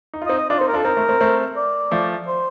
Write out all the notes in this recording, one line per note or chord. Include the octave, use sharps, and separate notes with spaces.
D#4
F4
D#5
C4 D#4
D#5
D4 F4 D5
C5
C4 D#4
A#4
D4 F4 A4
C4 D#4 A#4
A3 C4
A3 C4
A3 C4
D5
F3 A3
C5